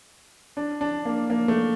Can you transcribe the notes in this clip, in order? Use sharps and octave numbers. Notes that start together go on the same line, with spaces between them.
D4
D4
A#3
A#3
A3